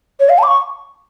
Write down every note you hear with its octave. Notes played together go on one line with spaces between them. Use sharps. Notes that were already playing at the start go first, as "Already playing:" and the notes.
C#5
F5
A5
D6
C#6